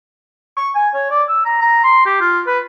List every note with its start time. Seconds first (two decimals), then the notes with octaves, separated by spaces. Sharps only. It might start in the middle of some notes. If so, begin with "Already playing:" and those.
0.57 C#6
0.75 G#5
0.94 C#5
1.11 D5
1.29 E6
1.45 A#5
1.62 A#5
1.84 C6
2.06 G4
2.21 F4
2.47 B4